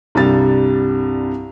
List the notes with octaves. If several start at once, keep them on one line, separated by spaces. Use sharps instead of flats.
C2 G2 G3 A6